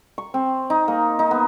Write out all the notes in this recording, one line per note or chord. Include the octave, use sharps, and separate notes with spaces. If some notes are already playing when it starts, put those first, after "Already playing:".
C#6
C4
D#4
A#3
D#4
B3